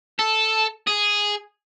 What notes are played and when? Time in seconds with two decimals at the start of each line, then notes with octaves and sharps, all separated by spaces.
0.19 A4
0.87 G#4